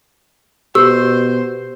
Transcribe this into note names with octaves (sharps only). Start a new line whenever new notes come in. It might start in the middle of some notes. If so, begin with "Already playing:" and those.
B2 G4 C5 E6